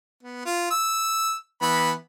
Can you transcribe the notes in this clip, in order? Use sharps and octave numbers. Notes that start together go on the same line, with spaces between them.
B3
F4
E6
E3 B3 B5